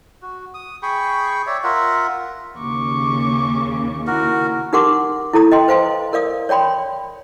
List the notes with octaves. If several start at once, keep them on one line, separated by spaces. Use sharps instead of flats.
F#4
D#6
G#4 G5 B5 C#6
C#5 D5 E5
F4 A#4 E5 F#5
D#2 C#3 C#6 D6
E4 F#4 A#4
D#4 G4 A#4 F#5 C6 D6
E4 A4 A#5 D#6
D#5 G5 C6
B4 C5 F5 G#5 C6
A#4 D5 F5 D#6
C#5 D5 G5 B5 C6